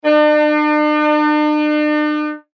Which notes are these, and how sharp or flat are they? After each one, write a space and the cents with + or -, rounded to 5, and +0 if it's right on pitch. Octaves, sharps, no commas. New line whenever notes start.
D4 +45